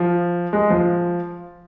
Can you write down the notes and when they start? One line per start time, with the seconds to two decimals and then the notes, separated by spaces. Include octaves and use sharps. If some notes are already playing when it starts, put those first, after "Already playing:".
Already playing: F3
0.53 G#3
0.70 F3